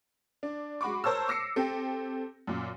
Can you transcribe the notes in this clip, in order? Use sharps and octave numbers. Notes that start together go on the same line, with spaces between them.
D4
G#3 F#4 B5 C#6 D6
A#4 C5 C#5 A5 E6
D6 E6 A#6 C7 C#7
C4 G4 A4
F#2 A#2